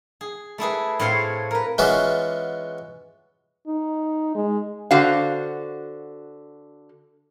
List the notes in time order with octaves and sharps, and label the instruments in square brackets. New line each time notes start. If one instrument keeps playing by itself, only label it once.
[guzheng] G#4
A3 E4 G#4 B4
A2 C4 C#5 F5 C6
A#4 B4
[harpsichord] E3 G#3 B3 C#4 F4 F#4
[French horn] D#4
G#3
[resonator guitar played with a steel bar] D3 F#4 C5 F5